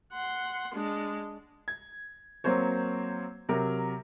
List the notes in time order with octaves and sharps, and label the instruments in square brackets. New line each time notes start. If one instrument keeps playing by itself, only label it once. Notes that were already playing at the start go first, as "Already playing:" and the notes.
[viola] F#5 C6
G#3 D4
[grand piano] G#6
F#3 A#3 C4 C5 C#5
C3 F#3 A#4